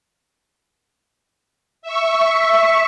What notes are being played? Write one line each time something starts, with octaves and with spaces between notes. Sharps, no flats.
E5 C#6